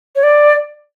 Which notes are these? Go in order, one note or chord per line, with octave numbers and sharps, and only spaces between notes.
C#5
D5